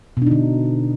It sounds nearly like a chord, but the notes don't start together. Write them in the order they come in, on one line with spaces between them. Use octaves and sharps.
B2 D4 D#4 D3